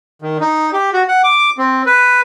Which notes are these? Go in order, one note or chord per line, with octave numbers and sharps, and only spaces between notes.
D#3
D#4
G4
F#4
F#5
D6
C4
B4